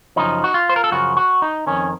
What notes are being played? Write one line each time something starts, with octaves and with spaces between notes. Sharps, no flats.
F#2 C#3 F3 D#4
F#4
F4
C5
A#4
A4
F#2 C#3 F3 F#4
F#4
D#4
F2 D#3 C#4